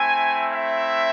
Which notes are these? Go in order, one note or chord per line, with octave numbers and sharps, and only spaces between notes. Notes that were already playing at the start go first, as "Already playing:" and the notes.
Already playing: A3 C4 E4 G#5
E5